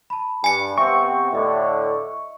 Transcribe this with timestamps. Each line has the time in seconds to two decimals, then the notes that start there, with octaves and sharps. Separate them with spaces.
0.10 A5 B5
0.44 G2 G#5 C#7
0.78 C3 B3 C4 E5 F5 G5 C#6
1.32 A2 D3 D#5 E5